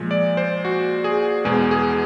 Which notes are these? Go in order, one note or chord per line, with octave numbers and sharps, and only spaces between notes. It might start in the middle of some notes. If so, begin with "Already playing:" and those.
Already playing: A#2 F3 G#3
D5
C5
F#4
G#4
E2 B2 G#3 G#4
G#4